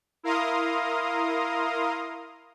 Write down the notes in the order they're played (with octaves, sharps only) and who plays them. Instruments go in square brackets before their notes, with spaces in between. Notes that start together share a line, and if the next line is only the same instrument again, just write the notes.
[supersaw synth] E4 A#4 F5 A#5 C6 D#6